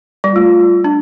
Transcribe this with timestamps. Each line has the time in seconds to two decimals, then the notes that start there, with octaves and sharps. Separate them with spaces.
0.24 G3
0.35 A3 F4
0.84 D4